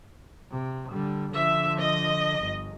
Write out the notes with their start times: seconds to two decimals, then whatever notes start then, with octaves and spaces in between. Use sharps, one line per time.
0.52 C3
0.91 D3 G3
1.32 D3 F3 E5
1.78 D#5
2.40 G1